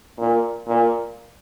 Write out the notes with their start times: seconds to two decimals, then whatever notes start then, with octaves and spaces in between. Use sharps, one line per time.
0.18 A#2
0.68 A#2